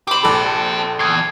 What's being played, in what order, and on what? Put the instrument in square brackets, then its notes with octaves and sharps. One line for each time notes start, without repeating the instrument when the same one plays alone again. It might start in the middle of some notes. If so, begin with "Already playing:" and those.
[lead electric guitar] G4 C5 [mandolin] B5 D6
[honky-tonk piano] A#1 A4
[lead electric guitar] E2 [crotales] G#6 C7